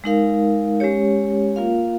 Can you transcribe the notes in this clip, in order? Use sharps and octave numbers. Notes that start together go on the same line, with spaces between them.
G#3 D#4 A#4 F5
G#3 C#4 G4 C#5
A#3 F4 A#4 F5